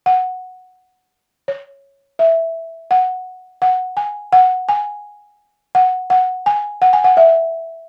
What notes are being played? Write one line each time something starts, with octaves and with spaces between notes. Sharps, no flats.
F#5
C#5
E5
F#5
F#5
G#5
F#5
G#5
F#5
F#5
G#5
F#5
G#5
F#5
E5